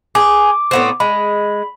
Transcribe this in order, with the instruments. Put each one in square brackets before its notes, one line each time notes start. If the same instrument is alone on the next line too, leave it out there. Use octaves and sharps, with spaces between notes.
[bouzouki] G#4 [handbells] D6
[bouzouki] A2 B3 C4
[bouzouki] G#3 [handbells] B5